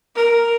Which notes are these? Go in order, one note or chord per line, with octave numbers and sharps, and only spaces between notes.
A#4